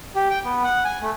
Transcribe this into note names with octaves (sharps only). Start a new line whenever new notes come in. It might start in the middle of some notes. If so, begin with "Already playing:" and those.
G4
G5
B3
F#5
G#5
A3